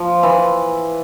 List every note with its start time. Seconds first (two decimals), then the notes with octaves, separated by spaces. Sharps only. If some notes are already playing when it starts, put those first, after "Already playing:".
Already playing: F3
0.23 E3